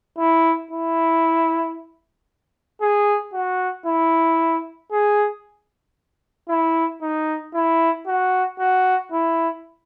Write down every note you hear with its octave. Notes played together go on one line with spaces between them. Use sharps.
E4
E4
G#4
F#4
E4
G#4
E4
D#4
E4
F#4
F#4
E4